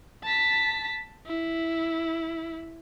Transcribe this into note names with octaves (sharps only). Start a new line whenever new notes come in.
A5 B6
E4